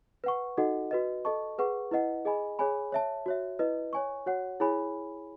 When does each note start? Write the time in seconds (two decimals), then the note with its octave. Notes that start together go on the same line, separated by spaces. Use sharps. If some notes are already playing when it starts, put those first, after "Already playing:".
0.24 B4 F#5 C#6
0.57 D#4 F#4 A4 D#5 F#5
0.91 F#4 B4 D#5
1.25 A4 D#5 A5 C#6
1.58 G#4 B4 F#5 C#6
1.91 E4 B4 D#5 F#5
2.25 G#4 D#5 G#5 B5
2.59 G#4 C#5 G#5 B5
2.92 C#5 E5 A5
3.26 F#4 C#5 E5
3.59 E4 B4 D#5
3.93 C#5 G#5 C#6
4.26 F#4 C#5 F#5
4.60 E4 G#4 C#5 G#5 B5